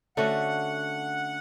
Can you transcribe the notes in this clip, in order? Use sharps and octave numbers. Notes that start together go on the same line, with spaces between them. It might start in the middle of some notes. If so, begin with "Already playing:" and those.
D3 A3 C#4 F#4 F#5